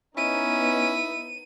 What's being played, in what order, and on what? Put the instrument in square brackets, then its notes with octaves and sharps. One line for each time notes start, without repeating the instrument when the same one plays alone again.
[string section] B3 D#4 [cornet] C#4 [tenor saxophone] E4 [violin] D#7